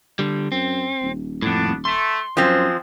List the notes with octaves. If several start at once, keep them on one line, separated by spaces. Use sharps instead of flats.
D3 G3
F#2 C4
D#1
F2 A2 B3 D4
A3 C6
F#2 F3 G#3 C4